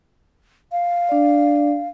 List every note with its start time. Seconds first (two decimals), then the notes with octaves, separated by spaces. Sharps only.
0.72 F5
1.09 D4 D5